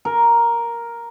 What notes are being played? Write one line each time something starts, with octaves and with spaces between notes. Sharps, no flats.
A#4